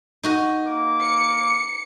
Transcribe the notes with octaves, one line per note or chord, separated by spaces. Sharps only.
D#4 F#4 D#5
A#3 D6
C#7